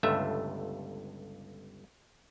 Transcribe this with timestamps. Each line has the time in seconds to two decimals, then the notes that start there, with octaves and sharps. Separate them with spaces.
0.03 G1 C#2 G2 A3 E5